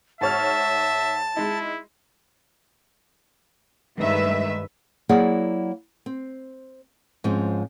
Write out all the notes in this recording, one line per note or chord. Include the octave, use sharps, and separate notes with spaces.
G#2 C#5 E5 A5 F6
G#3 D#4 E4
G2 D#3 G#3 A3 B4 E5
F#3 A#3 E4 G#4 D5 F#5
C4
G#2 F3 C4 C#4